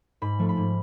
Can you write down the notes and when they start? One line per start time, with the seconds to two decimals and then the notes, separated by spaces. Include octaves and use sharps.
0.22 G#2 B5
0.39 F3 A3
0.49 B5
0.57 G#2